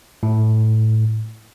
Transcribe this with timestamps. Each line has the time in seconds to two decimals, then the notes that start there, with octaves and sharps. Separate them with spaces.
0.23 A2